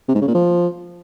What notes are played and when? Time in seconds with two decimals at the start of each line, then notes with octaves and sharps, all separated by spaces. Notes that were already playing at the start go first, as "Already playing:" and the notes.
0.09 C3
0.15 G#2
0.22 C#3
0.28 A#2
0.34 F3